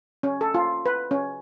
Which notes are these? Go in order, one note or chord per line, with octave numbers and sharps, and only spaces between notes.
C#4
A4
F4
B4
C#4